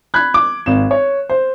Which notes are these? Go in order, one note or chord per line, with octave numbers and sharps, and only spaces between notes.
B5 F#6 G#6
D6
G#1 E7
C#5
C5